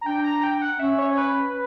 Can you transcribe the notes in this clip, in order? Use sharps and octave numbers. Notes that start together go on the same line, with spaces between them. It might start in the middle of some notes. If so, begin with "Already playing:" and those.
A#5
D4 G5
A#5
G5
F#5
C#4 E5
C#5
C#5
B4